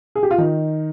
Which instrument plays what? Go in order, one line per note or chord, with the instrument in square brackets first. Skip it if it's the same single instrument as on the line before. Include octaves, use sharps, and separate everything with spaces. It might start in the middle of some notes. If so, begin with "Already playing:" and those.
[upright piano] G#4
G4
F4
D#3 D#4